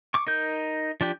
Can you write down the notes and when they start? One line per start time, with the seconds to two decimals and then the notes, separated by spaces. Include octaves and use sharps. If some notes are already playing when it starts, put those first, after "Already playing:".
0.14 C#6 D6
0.27 D#4 A#4 G6
1.01 F3 D4 G4